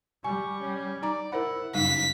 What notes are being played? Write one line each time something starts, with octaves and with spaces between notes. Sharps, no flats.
G3 G#5 C#6
C#4
D#4 D5 A#5 D6
E4 A#4 C5 F#5 B5
F#1 G3 D#4 F5 B6